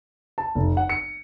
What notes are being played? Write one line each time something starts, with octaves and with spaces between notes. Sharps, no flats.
A5
F1
F#5
C#7